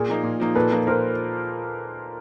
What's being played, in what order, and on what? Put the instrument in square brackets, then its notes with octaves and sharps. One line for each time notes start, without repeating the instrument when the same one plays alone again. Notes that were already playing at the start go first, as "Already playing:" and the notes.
Already playing: [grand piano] A#2 [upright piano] G#4 A#4
[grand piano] F3 A#3 D#4
A#2
F3 A#3 D#4
[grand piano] A#2 [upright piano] A4 B4
[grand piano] F3 A#3 D#4
[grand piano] A#2 [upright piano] A#4 C5